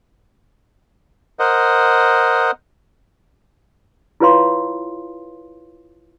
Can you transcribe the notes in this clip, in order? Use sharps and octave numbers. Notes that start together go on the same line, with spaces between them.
A#4 C5 D#5 F#5
E4 F4 B4 C#5 F5 C6